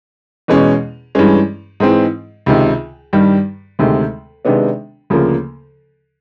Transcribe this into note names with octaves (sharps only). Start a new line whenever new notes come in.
E2 B2 G#3 C#4
G2 E3 G#3 C#4
G#2 E3 G#3 C4
C#2 C3 D#3
G2 D#3 G3
D2 C3 D#3 G#3
C3 D#3 G#3 B3 D4
D2 C#3 F3 A#3